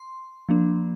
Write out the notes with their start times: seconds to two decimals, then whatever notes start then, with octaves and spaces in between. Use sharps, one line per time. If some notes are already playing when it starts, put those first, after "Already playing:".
Already playing: C6
0.49 F3 A#3 D4